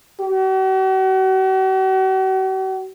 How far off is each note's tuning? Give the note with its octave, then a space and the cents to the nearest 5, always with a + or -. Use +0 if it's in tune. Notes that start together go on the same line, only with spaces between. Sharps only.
F#4 +45